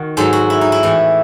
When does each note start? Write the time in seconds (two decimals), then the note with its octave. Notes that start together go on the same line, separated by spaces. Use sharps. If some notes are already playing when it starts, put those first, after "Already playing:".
Already playing: D#3 F#4
0.17 G#2 F#3 A4
0.33 F#4
0.50 E4
0.61 D#4
0.72 E4
0.83 A2 E3